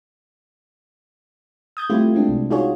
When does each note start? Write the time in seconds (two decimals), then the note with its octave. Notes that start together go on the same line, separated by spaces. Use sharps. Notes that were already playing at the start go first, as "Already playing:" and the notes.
1.77 D#6 G6 G#6
1.90 G3 A3 C4 E4 F4 G4
2.15 G#3 C4 D4
2.29 C2
2.50 D#4 F4 F#4 G#4 C#5